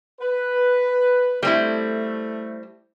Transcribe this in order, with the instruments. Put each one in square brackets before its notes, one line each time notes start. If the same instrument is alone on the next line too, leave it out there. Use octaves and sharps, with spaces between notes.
[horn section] B4
[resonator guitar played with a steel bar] G3 C4 E4 [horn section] A3